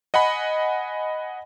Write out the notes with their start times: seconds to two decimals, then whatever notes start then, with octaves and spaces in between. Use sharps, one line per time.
0.14 D#5 F#5 G#5 B5